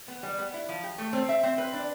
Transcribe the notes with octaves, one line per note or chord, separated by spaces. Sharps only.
B3
G3
B3
E4
F3
G4
A3
C4
E5
C4
B4
D4